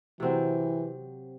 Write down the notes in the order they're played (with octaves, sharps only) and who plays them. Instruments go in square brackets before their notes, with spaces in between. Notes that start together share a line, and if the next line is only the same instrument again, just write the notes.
[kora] C3 F#3 C4 [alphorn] E3